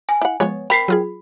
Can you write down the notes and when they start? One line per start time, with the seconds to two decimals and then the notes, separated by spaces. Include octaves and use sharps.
0.09 G#5
0.21 E4 F#5
0.40 F3 G#3 B3 C#5
0.70 C4 A#4 B5 B6 C7
0.88 F#3 F4 G#4